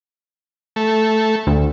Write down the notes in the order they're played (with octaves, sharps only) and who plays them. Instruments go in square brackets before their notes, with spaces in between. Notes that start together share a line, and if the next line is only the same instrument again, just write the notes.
[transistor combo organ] A3
[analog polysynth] D2